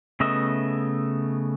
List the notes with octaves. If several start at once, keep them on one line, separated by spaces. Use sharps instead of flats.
C#3 A3 B3 D#5 E5